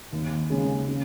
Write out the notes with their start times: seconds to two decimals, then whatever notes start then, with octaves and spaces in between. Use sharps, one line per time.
0.12 D#2
0.50 C#3 G#3
0.89 C#3